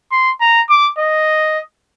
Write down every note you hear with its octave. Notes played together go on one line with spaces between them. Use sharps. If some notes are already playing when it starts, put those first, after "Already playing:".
C6
A#5
D6
D#5